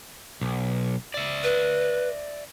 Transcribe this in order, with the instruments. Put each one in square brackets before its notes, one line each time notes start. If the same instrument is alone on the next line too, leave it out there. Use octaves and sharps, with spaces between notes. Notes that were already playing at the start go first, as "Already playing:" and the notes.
[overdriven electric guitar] B1
D5 E5
[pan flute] B4